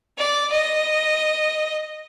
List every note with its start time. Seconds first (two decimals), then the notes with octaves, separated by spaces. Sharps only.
0.17 D5
0.52 D#5